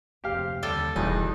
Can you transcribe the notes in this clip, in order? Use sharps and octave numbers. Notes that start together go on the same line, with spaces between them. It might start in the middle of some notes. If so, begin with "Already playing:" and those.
F1 D2 C4 G4 F5
D#2 D3 G3 A4 G5
E1 E2 G2 B2 D#4